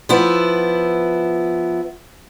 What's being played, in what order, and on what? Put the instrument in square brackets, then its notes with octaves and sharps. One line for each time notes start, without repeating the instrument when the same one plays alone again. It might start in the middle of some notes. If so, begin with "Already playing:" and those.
[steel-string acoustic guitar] F3 B3 E4